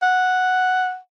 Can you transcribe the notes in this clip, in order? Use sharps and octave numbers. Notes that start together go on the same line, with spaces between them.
F#5